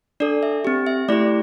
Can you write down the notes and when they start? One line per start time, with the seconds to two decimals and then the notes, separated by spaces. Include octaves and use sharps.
0.20 D4 A4 D5
0.43 E5
0.65 C4 G4
0.86 E5
1.08 A3 E4 G4 D5